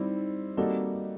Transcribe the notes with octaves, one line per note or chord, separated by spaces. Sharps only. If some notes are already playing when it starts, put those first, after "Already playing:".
Already playing: G3 C4 D#4 E4
G3 A#3 C4 D#4 F#4 A4